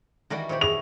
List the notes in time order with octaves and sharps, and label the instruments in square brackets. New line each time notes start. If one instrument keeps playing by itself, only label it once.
[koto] D#3 A#4 D5 [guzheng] E3 G3 F#4
[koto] A#2 D#3 G4 [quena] C5 [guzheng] C#5 B5
[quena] G#4 [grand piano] F7